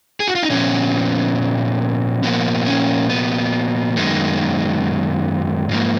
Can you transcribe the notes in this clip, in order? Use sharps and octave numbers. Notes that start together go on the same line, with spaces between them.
G#4
F#4
F4
D#4
A#2 F3 B3 C#4
A#2 F3 A#3 B3
C#4
B3
F#2 D#3 G#3 B3
G#2 F3 A#3